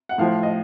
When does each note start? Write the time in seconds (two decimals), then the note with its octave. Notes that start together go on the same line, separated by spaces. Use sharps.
0.09 F#5
0.18 A2 F3 F5
0.43 D#5